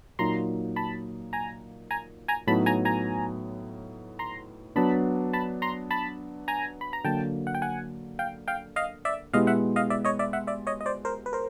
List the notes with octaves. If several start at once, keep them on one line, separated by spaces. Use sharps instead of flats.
A#2 F#3 A#3 D#4 A#5 C6
A5 B5
G#5 A#5
G#5 A#5
G#5 A#5
A2 F#3 B3 D#4 A5 B5
G#5 A#5
G#5 A#5
A#5 C6
F#3 B3 D4 A5 B5
A5 B5
A#5 C6
A5 B5
G#5 A#5
B5
A#5
D3 F#3 A#3 G5 A5
F#5
G5
F#5 G#5
F5 G5
F5 G5
D#5 F5
D5 E5
B2 G#3 B3 E4 G4 D#5 F5
E5 F#5
D#5 F5
D5 E5
C#5 D#5
D5 E5
E5 F#5
D5 E5
C#5 D#5
D#5
C5 D5
A#4 C5
B4
A#4 C5